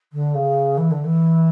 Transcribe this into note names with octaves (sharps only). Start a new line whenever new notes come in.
D3
C#3
E3
D3
E3